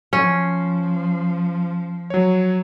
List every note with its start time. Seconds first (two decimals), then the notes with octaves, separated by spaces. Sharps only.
0.13 F3 C#4
2.10 F#3 C#5